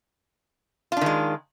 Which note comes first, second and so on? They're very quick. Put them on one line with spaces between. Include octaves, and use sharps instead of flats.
F4 D4 D#3 G#3